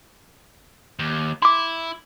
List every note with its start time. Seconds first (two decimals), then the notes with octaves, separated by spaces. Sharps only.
0.99 D#2
1.42 E4 C6 D6